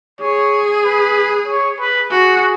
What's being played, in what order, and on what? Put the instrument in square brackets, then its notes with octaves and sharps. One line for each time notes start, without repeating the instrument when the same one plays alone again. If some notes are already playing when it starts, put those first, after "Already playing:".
[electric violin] G#4 [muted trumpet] C#5
[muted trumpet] B4
C#5
B4
[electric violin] F#4 [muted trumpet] G#4